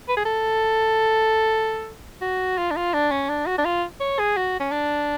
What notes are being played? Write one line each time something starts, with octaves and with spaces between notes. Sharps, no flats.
B4
G#4
A4
F#4
F4
D4
F4
D4
C#4
D4
F#4
D4
F4
C#5
G#4
F#4
C#4
D4